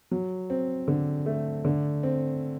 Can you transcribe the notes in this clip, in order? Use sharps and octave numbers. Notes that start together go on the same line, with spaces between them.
F#3
C4
D3
A3
D3
C4